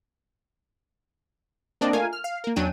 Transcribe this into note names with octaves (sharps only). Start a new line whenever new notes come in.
A#3 C4 D4 D5 D#5
A3 F4 A#4 F5 G#5
F6
F5
A#3 A#4
E2 F#3 C#4 D4 G5 D#7